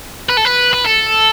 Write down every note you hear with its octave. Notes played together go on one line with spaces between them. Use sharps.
B4
A4
B4
B4
A4